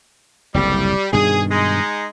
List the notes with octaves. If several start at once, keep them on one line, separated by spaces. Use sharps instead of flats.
F#1 C2 A2 G3
G2 B2 D#3 G#4
G#3 D#4